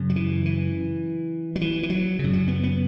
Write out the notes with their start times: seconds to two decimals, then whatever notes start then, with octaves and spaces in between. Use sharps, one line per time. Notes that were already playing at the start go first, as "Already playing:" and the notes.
Already playing: F#2 C#3
0.10 F#3
0.16 E3
0.46 E3
1.56 F#3
1.61 E3
1.83 E3
1.90 F#3
2.19 F#2 C#3
2.33 F#3
2.48 B3
2.63 B3